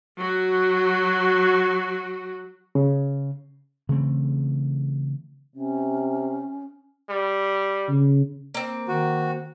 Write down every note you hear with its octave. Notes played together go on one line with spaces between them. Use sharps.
F#3 F#4
C#3
C#3 E3 A3 C4
C3 C#4
G3
C#3
A#3 C4
D#3 F#4